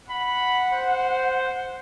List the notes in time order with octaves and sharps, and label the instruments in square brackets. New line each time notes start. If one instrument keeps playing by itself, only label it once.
[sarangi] F#5 [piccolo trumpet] B5
[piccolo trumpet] C5